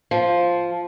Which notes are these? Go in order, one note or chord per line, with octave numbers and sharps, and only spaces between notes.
F3